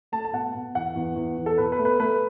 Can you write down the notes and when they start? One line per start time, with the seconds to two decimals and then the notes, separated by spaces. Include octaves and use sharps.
0.12 A3 A5
0.24 A5
0.33 B2 F#5
0.55 B2
0.75 E2 F#5
0.95 E2
1.16 E2
1.38 E2
1.46 A4
1.58 B2 B4
1.72 B4
1.79 A3
1.85 B4
2.00 A3 B4